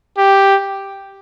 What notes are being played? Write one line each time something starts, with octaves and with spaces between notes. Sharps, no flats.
G4